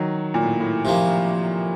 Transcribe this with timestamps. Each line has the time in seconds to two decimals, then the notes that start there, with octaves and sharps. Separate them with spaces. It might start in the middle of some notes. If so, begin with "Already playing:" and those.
Already playing: D#3 F#3
0.34 A#2
0.43 A2
0.60 A2
0.85 C3 F3 A#3